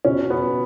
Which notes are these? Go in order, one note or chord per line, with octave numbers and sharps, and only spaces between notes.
B2 C#4
B3